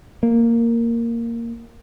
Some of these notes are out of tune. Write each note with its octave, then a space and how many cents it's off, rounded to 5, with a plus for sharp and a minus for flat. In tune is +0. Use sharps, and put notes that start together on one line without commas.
A#3 -5